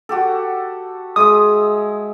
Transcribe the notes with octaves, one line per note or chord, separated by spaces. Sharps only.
F#4 G4 A4
G#3 E5 D#6